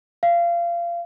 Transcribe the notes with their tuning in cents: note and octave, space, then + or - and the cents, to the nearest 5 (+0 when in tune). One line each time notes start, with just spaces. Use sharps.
F5 -25